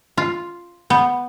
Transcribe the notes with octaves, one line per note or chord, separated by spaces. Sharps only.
F4
B3